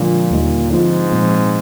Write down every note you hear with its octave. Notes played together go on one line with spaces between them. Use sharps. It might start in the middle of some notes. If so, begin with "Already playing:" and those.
Already playing: A#2 D3 F3 G#3 D4 F4
D#2 D3 G3 A#3 D#4
G#2 D3 F3 C4 F4
A#2 F3 G#3 C4